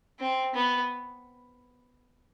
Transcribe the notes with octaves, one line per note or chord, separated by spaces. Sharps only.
C4
B3